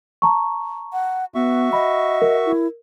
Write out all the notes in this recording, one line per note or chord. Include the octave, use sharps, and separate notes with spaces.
A5 A#5 C#6
F#5
B3 F#4 E5 C#6
D#5 B5
A#4
E4